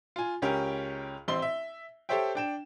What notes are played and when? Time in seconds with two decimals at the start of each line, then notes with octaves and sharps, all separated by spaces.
0.16 F4 G#5
0.42 C#2 C#4 G4 A#4
1.28 A1 C4 E4 C6 G7
1.42 E5
2.09 G4 A4 C5 C#5 E5 G5
2.35 D4 G5 E7